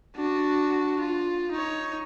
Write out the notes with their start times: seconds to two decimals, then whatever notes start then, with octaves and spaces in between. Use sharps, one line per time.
0.15 D4 F#4
1.01 F4
1.52 D#4 C#5